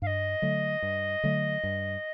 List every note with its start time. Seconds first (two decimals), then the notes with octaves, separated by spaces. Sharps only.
0.02 G2 F5
0.06 D#5
0.42 D3 F#3 A3
0.82 G2
1.24 D3 F#3 A3
1.63 G2